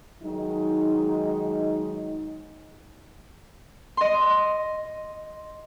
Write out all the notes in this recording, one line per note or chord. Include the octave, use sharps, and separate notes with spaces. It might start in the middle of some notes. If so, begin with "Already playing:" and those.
D#3 F#3 G#3 D#4
D#5 C6